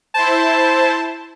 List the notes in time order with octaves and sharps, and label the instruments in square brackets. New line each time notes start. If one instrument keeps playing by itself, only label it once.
[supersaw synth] E4 C5 [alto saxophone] A5